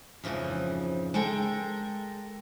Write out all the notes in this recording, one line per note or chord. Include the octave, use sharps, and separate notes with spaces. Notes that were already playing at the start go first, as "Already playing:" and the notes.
F2 G#2 C#3 E3 F3
G#3 A4 A#4 G5